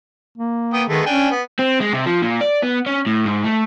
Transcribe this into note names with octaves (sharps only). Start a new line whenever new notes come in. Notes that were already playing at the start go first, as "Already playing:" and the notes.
A#3
B3 G5 D#6
D#3 G#3 A3 B3
C#4 D4 G5 G#5
B3
C4
G#3
C3
F3
A#2
D5
B3
C#4
A2
G#2
A3